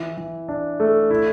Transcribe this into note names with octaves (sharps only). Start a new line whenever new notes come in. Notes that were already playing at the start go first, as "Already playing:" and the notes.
Already playing: E3
E3
D4
A3
E4